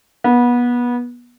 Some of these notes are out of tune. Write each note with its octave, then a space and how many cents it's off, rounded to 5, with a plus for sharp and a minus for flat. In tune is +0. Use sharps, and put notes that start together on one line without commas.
B3 -25